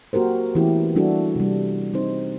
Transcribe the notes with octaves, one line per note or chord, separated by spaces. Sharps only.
A#3 F#4 G4 A#4 C5
E3 A3 B3 C#4 E4 G4
G3 B3 D4 E4 F#4 A4
C3 G3
G3 C4 D#4 C5